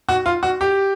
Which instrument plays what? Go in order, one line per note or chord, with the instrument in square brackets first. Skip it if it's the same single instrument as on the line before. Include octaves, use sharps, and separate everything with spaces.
[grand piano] F#4
F4
F#4
G4